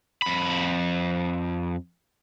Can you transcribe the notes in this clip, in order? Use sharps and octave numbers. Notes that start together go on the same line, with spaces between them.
F2 B5